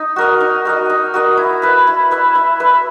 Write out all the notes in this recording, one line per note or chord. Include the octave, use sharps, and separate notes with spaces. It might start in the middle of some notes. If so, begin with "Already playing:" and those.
Already playing: D#4
F#4 A#4 D#5
D#4
F#4 A#4 D#5
D#4
F#4 A#4 D#5
E4
B4 E5
E4
B4 E5
E4
B4 E5